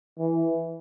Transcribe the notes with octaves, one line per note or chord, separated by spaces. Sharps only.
E3